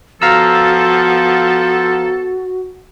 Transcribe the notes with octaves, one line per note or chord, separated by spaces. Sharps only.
F3 B3 F#4 A4 F5 A#5 E6